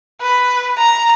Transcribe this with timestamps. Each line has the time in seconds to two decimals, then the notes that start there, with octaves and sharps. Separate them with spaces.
0.21 B4
0.77 A#5